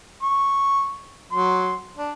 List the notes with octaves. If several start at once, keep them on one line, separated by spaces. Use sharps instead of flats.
C#6
F#3 C6
D4